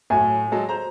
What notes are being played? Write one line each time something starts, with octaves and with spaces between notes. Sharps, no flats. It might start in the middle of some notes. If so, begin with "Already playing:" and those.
A2 F#3 G#5
F#3 G#3 A4
C5 A#5